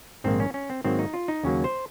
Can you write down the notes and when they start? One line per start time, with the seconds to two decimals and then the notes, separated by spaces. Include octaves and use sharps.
0.24 A#1 G#2 D#3 A#3 C4
0.40 C#4
0.54 C#4
0.70 C4
0.84 G#2 D#3 F#3 A#3 C4
0.99 D#4
1.14 F4
1.28 D#4
1.44 D#2 C#3 F#3 A#3 C#4
1.64 C5